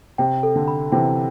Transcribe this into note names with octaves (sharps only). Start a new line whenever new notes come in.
C3 G5
A4
D3
B5
C3 E3 G5